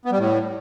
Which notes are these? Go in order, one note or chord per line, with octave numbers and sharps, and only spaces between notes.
B3
G3
A2